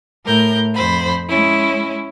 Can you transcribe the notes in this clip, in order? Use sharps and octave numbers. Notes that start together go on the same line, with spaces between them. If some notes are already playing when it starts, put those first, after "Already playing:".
A2 A#4 G6
F2 C5 B5
G#3 C#4 E4